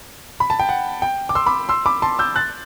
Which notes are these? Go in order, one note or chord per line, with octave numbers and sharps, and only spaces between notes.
B5
A5
G5
F#5
G5
D6
C6 E6
B5 D6
C6 E6
B5 D6
A5 C6
E6 G6
F#6 A6